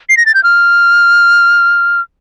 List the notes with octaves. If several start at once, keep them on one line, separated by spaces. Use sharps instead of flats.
C7
A#6
A6
G6
F6